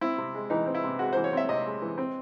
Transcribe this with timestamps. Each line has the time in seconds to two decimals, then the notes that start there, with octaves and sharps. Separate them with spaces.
0.01 C4 E4
0.18 C3
0.35 G#3
0.50 E3 D#4
0.66 C4
0.74 E4
0.84 C3
0.99 G#3 F#4
1.13 C5
1.16 E3
1.24 C#5
1.33 C4 E5
1.49 C3 D#5
1.66 G#3
1.82 E3
1.98 C4